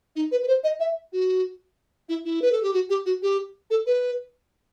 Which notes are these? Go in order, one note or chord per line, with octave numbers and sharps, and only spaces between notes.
D#4
B4
B4
C5
D#5
E5
F#4
E4
E4
B4
A4
G4
F#4
G4
F#4
G4
A4
B4